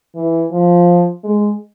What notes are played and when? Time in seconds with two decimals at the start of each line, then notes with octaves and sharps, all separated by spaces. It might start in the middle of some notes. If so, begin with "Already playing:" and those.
0.15 E3
0.52 F3
1.24 G#3